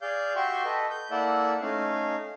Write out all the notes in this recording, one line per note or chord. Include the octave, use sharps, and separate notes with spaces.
G#4 D5 F5 G6
F#4 G4 E5 G5 C6 C#6
A4 B4 D#5
G6
A#3 E4 A4 D5 E5 F#5
A3 C#4 D#4 F5